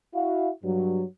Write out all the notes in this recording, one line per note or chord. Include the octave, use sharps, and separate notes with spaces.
E4 F#4 F5
G2 F#3